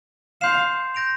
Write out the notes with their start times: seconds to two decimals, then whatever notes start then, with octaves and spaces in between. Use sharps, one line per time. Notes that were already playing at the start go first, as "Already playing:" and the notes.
0.41 F5 C6 G6 C7 E7
0.95 G6 A#6 D7 F7